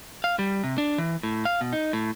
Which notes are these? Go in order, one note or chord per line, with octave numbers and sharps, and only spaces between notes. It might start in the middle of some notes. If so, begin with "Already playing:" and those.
F5
G3
C3
D4
E3
A2
F5
B2
D#4
A2